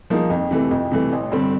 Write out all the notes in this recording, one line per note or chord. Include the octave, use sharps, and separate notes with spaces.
F3 A#3 D#4 G#4
F2
C3 E3 A3
F2
C3 E3 A3
A1
G2 D3 G3 C4